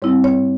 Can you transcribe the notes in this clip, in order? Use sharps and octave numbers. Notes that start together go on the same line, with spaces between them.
G#2 G3 C4 E4 C#5
C#5